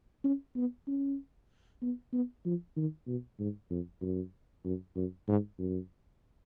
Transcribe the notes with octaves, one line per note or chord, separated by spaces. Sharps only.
C#4
B3
C#4
B3
B3
F3
D#3
B2
G#2
F2
F#2
F#2
F#2
G#2
F#2